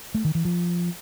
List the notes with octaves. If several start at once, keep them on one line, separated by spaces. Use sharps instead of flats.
A3
D#3
E3
F3